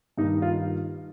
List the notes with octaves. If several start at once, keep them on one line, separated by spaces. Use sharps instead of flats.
G2 D#3 A#3 D#4
F4